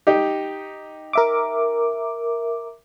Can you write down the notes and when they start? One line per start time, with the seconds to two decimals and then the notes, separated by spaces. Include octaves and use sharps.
0.07 D#4 G4
1.13 A#4 E5 D6